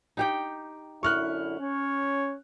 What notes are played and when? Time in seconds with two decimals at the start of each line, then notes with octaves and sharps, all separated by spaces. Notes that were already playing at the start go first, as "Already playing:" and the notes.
0.17 D#4 G4 G5
1.03 F#2 D3 E4 C#6 F6 F#6
1.60 C#4 C#5